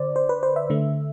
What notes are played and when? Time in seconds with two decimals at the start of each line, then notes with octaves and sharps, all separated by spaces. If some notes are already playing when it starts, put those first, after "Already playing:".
Already playing: D3 C5 D5
0.16 C5
0.29 B4
0.43 C5
0.56 E5
0.70 D3 A3